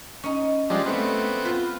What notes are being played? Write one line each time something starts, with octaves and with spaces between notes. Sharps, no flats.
C#4 D#4
F3 G3 G#3 D4
A3 B3 C4
F4 B4